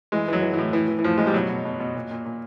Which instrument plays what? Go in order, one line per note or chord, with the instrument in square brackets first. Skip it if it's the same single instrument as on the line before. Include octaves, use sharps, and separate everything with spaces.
[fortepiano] E3 G#3
E3 F#3
E3
A2 E3
A2 E3
E3
E3
A2 F3
A2 G#3
G3
B2 F#3
B2
B2
B2
A#2
A#2
A#2